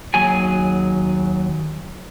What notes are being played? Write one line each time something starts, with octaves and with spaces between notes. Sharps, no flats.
D#2 F#3 G#4 G#5